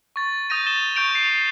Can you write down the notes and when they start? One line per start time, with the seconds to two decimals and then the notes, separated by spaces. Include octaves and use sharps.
0.16 C#6 A6
0.50 D#6 G6 A#6 D#7
0.66 A6 E7 G7
0.96 C#6 G6 D7 F7
1.15 C7 D7